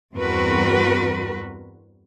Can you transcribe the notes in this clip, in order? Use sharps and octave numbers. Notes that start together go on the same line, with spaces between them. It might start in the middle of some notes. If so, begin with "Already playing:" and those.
E2 G2 C4 F#4 A#4 B4